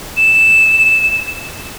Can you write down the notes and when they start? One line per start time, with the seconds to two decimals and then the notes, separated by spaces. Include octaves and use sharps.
0.17 E7